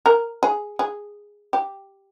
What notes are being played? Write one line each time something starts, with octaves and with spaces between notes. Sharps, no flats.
A#4
G#4
G#4
G4